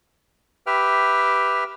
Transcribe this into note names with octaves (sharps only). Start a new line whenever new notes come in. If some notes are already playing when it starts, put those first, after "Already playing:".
G4 B4 E5 G5 F6